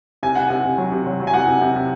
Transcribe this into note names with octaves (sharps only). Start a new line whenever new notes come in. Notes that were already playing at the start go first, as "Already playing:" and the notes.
C3 G#5
C3 F#5
C3 G#5
C3
F#3
C3
F#3
F#3
G#5
C3 F#5
C3
C3
C3